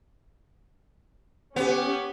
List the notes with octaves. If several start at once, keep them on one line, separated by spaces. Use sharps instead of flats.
B3 C#4 G4